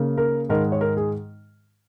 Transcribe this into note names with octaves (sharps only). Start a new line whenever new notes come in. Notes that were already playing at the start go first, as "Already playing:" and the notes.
Already playing: C#3 A#3
A#4
G#2 D#3 G#3 A#4
C#5
A#4
G#4